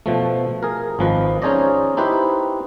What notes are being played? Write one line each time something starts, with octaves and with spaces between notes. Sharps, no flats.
B2 F3 A3
G#4 A#4
G#1 F3 B4 D#5
C#4 D#4 G#4 C5 D5 D#5
D#4 E4 G4 B4 C5